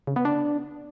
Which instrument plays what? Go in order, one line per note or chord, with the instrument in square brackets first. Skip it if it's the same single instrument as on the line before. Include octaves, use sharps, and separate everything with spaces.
[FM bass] C#3
B3
D4